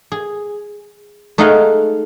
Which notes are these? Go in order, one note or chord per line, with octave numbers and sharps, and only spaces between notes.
G#4
A3 D#4 G#4 D#5 F5 F#5